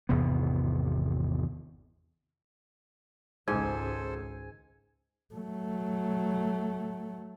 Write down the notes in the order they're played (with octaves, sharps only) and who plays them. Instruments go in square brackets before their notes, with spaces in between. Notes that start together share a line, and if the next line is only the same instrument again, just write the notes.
[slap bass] G#1 E2 C3 B3
[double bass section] G#1 C#2 [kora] G#2 [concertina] A4 C5 [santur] G#5
[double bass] F#3 A3